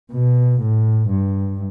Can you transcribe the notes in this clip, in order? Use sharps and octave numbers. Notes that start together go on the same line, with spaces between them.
B2
A2
G2